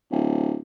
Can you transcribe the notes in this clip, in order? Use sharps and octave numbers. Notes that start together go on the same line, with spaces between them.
D1